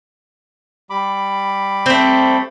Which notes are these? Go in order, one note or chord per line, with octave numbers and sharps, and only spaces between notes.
G3 B5 D6
A3 C4